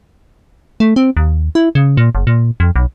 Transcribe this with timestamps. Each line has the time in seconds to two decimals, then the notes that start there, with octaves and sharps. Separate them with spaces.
0.80 A3
0.96 C4
1.17 D#2
1.55 E4
1.75 C#3
1.97 A#2
2.15 F#1
2.27 A#2
2.60 F2
2.76 B1